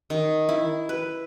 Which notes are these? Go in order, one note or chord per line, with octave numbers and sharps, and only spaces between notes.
D#3
E4
B4